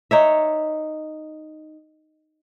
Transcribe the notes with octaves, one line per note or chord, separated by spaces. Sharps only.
D#4 C#5 E5